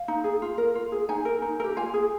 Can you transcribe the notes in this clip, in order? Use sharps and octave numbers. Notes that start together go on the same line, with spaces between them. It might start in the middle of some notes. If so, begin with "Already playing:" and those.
Already playing: F5
D#4
G#4
F4
A#4
F4
G#4
D#4 G#5
A#4
D#4
A#4
G4
F4 G#5
G#4